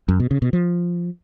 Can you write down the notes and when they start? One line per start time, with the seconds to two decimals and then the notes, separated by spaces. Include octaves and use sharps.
0.08 F#2
0.20 B2
0.31 C#3
0.42 B2
0.53 F3